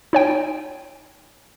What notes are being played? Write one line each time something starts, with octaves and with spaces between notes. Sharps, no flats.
D#4 C#5 G5